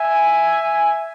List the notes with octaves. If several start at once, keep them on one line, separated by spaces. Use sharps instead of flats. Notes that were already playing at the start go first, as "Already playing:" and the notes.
Already playing: E5 G#5